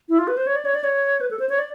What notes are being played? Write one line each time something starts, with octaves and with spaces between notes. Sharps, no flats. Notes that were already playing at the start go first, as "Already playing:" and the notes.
E4
F4
B4
C5
C#5
D5
C#5
D5
C#5
B4
A4
C5
C#5
D5